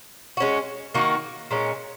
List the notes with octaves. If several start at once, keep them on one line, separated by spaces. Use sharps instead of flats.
G#3 C#4 F#4
D#3 A#3 D#4 F#4
A#2 G#3 C#4